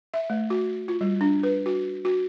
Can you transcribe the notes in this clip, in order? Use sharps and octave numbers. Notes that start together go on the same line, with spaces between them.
E5
A3
F#4
F4
G3
D4
B4
F#4
F#4